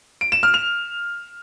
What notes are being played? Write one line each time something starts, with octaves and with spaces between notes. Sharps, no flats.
D7
E7
F6
F7